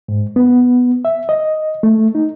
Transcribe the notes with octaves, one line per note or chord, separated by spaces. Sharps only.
G#2
B3
E5
D#5
A3
D#4